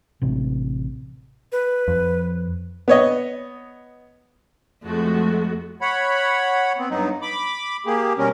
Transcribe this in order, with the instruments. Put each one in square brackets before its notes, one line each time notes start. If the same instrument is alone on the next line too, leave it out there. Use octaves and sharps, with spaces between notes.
[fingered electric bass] A1 C3
[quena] B4
[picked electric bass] F2
[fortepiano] B3 C#5 D#5
[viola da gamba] F2 [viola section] G#3 A3 F#4
[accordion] C#5 F#5 B5
B3 C4
G2 F#3 B3 D#4
B5 D6
A#3 G4 G#4
B2 G3 C#4 A#4